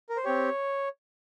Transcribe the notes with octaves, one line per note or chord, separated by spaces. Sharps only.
A#4
C5
C4 G4 C#5